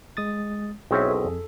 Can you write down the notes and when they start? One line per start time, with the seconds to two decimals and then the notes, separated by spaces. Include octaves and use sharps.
0.17 G#3 D#6 A6
0.91 B1 C4 C#4 E4 G#4 B4 C#5 E5
1.09 A4
1.25 F2